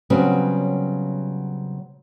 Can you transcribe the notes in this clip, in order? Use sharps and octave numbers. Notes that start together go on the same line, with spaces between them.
C#3 F#3 G3 B3 C4